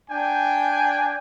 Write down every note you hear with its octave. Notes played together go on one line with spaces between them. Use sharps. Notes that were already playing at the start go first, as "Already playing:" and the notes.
D4 G5 G#5